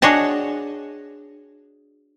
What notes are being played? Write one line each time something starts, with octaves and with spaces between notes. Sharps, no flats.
D4 F#4 G#4 C#5 D#5 A5